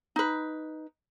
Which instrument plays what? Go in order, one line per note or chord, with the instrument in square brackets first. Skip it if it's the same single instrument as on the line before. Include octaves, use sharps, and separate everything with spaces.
[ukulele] D#4 B4